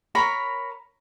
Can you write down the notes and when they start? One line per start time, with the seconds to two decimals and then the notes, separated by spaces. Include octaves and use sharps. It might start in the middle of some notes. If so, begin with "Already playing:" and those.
0.15 A#4 C#5 A#5 B5